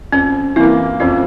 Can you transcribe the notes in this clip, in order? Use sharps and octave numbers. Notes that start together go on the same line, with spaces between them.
F2 C#4
E3 A#3 C4 E4
F2 C#4 F4